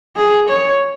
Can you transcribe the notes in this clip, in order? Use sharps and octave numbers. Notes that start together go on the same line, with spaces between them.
G#4
C#5